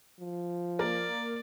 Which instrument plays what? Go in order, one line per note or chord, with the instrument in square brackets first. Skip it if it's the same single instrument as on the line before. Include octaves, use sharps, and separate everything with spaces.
[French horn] F3
[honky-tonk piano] A#3 A#4 [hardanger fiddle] D5